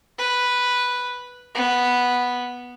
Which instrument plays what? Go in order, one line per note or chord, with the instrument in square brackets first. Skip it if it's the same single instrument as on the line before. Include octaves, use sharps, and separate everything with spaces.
[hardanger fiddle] B4
B3